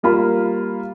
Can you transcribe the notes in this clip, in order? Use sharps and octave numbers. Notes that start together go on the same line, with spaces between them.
G3 A#3 F4 B5